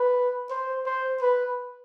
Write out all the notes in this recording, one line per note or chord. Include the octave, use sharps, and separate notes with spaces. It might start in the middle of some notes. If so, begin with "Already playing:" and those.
Already playing: B4
C5
C5
B4